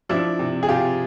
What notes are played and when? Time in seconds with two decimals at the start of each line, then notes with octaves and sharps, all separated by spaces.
0.09 F3 D4 E4
0.39 C3
0.63 G#4
0.68 C3 F4 G4